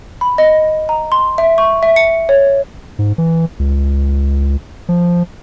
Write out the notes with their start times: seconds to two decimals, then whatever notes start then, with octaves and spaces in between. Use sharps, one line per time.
0.21 B5
0.38 D#5
0.89 A#5
1.12 C6
1.38 E5
1.58 C#6
1.83 E5
1.96 C#7
2.29 C#5
2.99 G#2
3.18 E3
3.59 C#2
4.89 F3